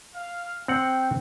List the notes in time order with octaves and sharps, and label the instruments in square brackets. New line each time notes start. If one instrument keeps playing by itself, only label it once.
[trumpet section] F5
[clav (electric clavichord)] C4 F#5 [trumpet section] G5